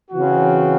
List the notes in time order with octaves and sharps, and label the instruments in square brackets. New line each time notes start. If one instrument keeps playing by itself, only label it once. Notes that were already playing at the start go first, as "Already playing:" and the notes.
[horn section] C#3 E3 C4 F#4